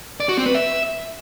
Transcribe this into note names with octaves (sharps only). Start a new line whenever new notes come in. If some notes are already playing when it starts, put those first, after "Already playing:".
D5
F#4
C4
B4
E5